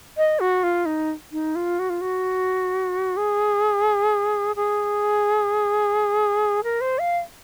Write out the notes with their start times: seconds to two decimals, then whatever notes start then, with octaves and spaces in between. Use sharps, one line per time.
0.17 D#5
0.40 F#4
0.63 F4
0.86 D#4
1.32 D#4
1.55 F4
1.79 F#4
1.90 F4
2.01 F#4
3.17 G#4
4.56 G#4
6.64 A#4
6.81 C5
6.99 F5